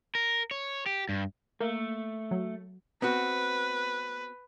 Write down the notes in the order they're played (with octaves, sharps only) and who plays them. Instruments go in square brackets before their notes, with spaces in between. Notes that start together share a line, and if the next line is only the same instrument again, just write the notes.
[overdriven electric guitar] A#4
C#5
G4
G2
[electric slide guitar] A3 [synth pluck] A#3
[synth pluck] F#3
[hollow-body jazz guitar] B3 C4 F#4 [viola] B4